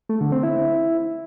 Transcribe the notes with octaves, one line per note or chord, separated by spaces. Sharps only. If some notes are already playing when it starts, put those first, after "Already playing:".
A3
D3
C4
E4